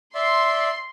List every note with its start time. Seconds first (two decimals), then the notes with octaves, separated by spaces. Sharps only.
0.15 D5 E5 C6